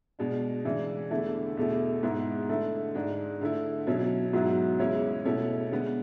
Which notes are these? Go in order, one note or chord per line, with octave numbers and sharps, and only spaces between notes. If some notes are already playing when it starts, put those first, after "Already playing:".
B2 G#3 D4
C#3 E3 G#3 D4
E2 D3 A3 E4
E2 B2 A3 E4
G#2 G#3 B3 E4
D3 A3 E4
G#2 G#3 D4
D3 A3 E4
B2 F#3 C#4 E4
G#2 F#3 B3 E4
E2 C#3 G#3 C#4 E4
B2 A3 C#4 E4
D3 G#3 B3